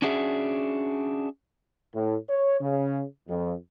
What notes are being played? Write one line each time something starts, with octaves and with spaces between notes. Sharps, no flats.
C#4 D4 F#4 G#4 E5
A2
C#5
C#3
F2